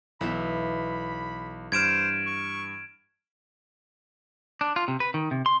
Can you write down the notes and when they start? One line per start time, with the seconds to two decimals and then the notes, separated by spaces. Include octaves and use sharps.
0.21 B1 E3 B3 E5 B5
1.72 G2 C5 F6 G#6 D7 E7
2.26 C#6
4.61 D4
4.76 F4
4.88 C3
5.00 B4
5.14 D#3
5.31 C3
5.46 C6